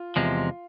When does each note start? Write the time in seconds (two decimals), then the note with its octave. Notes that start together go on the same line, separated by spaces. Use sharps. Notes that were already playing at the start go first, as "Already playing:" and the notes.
Already playing: F4
0.16 E2 C3 F3 G#3